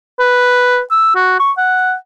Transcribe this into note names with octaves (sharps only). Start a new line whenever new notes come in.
B4
E6
F#4
C#6
F#5